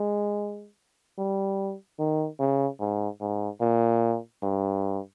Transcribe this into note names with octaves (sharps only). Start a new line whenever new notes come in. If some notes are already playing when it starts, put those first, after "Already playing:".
Already playing: G#3
G3
D#3
C#3
G#2
G#2
A#2
G2